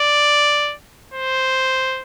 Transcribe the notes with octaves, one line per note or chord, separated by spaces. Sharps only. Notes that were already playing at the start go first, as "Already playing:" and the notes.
Already playing: D5
C5